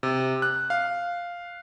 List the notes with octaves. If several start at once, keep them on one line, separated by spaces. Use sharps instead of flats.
C3
F#6
F5